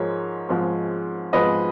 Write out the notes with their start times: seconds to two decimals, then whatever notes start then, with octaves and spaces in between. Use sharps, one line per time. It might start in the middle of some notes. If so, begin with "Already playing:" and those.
Already playing: G#2 F3 G#3 A#4 C#5
0.49 G#2 F3 G#3
1.33 G#2 F3 G#3 B4 D#5